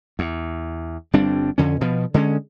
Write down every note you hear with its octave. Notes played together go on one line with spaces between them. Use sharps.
E2
G1 G3 C4 D4
F2 D3 C#4
B2 F3
D3 G#3 A3 C#4